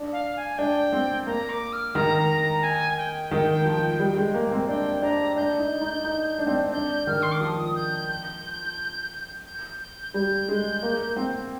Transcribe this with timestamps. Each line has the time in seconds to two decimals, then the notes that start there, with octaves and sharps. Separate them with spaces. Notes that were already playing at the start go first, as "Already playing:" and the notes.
Already playing: D4
0.12 F5
0.36 G#5
0.58 D4 G5
0.92 C4
1.26 A#3 A#5
1.49 D6
1.73 F6
1.95 D#3 A#5
2.18 A#5
2.41 A#5
2.63 G#5
2.98 G5
3.31 D#3
3.65 F3
3.99 G3
4.17 G#3
4.34 A#3
4.51 C4
4.68 D4 G5
5.02 D4 A#5
5.36 D4 G6
5.59 D#4
5.82 D#4
6.04 D#4
6.38 D4
6.47 C4
6.55 D4
6.73 D4 G6
7.07 D#3 F6
7.22 C6
7.32 D6
7.41 F3 D#6
7.76 G6
8.09 G6
9.46 G6
9.80 G6
10.14 G3 G6
10.48 G#3
10.83 A#3
11.16 C4